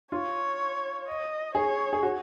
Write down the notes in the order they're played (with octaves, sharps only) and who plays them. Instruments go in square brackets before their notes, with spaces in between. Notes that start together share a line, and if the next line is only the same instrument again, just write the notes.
[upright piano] F4 [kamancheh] C#5
[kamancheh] D#5
[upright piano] G#4 [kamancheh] C#5
[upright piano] G#4
F#4